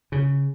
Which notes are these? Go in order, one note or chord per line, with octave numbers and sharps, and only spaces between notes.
C#3